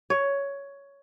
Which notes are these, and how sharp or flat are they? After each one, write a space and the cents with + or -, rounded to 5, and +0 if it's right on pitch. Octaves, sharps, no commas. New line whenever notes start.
C#5 +10